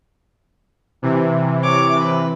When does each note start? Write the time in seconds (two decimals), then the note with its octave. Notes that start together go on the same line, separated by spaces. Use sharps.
1.02 C3 E3
1.63 C#5 D6
1.99 B4